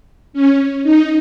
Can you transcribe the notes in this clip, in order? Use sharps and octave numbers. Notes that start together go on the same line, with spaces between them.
C#4
D#4